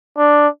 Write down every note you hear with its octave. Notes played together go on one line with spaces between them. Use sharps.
D4